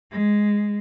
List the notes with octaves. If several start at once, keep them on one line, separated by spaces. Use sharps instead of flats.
G#3